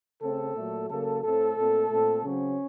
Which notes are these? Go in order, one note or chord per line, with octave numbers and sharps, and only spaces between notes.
C#3 A3 C4 A4
A#2 F#3 A3
C#3 F#3 A#3 A4
A2 A3 C4 A4
A#2 A3 C4
A#2 A3 C4
C#3 F#3 C4 C#4